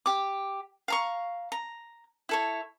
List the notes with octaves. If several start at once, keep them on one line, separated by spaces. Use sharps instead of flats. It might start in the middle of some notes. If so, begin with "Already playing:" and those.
G4 D6
F5 A#5 C#6
A#5
E4 A4 C#5